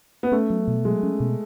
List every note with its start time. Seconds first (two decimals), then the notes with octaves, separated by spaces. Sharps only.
0.23 B3
0.32 A3 C#4
0.50 F#3
0.68 B2
0.85 F#3 G#3
1.03 C#4
1.20 B2